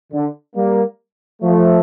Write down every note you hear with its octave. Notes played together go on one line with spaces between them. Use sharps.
D3
G3 A#3
F3 A3